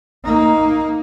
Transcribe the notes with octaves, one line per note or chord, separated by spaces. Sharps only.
A#3 D#4